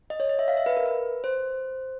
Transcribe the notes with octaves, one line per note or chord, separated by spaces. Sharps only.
D#5
C#5
D#5
E5
F5
E5
B4
A#4
B4
C5